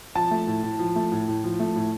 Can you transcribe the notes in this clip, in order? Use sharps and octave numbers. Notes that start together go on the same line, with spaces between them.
F3 A5
A3
A2
A2
F3
A3
A2
A2
F3
A3
A2